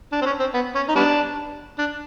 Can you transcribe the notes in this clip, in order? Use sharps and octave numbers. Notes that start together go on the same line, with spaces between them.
D4
C4
C#4
C4
B3
C#4
D#4
G3 B3 D4
D4